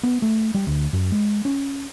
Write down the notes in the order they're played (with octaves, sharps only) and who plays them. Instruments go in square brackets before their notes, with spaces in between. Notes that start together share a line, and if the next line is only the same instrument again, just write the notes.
[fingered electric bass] B3
A3
G3
D2
F#2
G#3
C#4